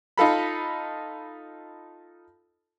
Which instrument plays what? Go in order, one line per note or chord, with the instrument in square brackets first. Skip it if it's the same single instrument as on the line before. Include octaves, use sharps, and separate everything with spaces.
[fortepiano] D#4 F4 A4 B5